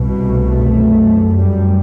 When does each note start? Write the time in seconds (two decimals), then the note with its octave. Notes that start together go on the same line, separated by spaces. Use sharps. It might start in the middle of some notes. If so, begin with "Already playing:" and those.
Already playing: C2 B2
0.25 A3
0.61 F#2
1.33 F#2 G3